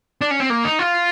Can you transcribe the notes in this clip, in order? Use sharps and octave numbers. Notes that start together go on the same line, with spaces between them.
D4
C#4
C4
A#3
D#4
F4